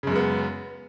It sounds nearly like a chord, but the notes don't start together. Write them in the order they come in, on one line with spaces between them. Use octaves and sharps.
C#3 F#2 G#3 B3